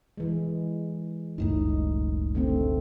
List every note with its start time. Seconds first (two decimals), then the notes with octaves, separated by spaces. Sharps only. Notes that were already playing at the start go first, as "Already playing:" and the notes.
0.17 E3 G#3
1.38 F#1 C#2 A2 D#4
2.35 D3 A3 C4